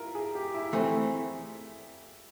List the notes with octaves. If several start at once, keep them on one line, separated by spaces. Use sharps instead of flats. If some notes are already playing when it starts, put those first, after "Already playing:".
Already playing: E4 F4 A#4
G#4
G4
E4
E3 A3 C4